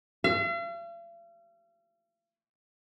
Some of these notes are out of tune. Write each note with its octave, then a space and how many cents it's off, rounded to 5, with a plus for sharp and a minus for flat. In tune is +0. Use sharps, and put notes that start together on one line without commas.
F5 -45